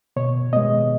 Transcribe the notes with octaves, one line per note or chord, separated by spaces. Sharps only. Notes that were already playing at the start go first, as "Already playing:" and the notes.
B2 C#5
G#3 B3 D#5